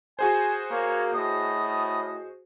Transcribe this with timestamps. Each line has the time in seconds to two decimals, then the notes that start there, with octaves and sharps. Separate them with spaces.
0.19 F#4 G#4 C5 G#5
0.71 A#3 C#5
1.14 A2 D#5